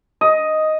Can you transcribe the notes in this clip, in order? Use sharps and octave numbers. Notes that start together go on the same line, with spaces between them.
D#5